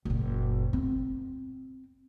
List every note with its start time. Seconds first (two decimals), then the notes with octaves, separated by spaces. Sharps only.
0.05 F#1 A#2
0.73 C4